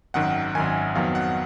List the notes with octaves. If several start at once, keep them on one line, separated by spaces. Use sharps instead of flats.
G#1 F#2 D#3 F#5
G#1 F#2 D#3 G#5
F2 D#3 F#3 B3 F5
F#5